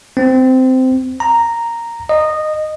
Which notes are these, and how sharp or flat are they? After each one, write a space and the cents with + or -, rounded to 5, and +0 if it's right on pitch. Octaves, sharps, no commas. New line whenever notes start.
C4 -15
A#5 -5
D#5 -15